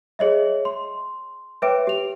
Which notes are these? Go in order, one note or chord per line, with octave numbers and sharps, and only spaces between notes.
G#4 C#5 D#5 E5
C6
B4 C#5 E5 G5 D6 D7
G4 F7